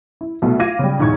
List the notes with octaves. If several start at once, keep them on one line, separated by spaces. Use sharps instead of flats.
E4
C2 B2 A3
F4 F5 D6 G#6 A#6 D#7
C#3 G3
B1 E2 G#2 C#6 G#6